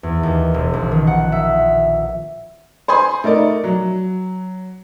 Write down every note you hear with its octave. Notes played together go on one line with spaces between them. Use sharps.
E2
D#2
E1
A#1
D#3
F#5
E5
C5 G#5 B5 C6
A3 D#4 A#4 D5
F#3